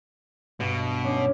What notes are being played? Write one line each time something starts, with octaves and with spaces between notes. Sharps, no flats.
G2 B2
C#4 D4